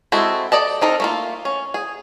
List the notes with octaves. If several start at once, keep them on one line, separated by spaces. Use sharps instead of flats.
G#3 C4 E4 F#4 A4
A4 D5 D#5 A5
C4 D#4 A4 A#4
A3 A#3 F4
C#4
G#4